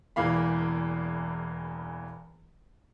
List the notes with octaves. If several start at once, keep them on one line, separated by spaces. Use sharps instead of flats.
E1 E2 E3 A#3 F5 B5